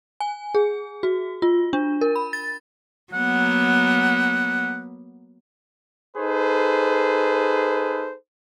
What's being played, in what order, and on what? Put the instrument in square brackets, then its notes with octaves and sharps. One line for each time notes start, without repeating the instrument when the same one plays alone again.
[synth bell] G#5
G#4
F#4
F4
D4
A#4
B5
A6
[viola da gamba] F#3 A#3 B3 [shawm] F#5
[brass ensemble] D#4 G#4 A4 B4 C5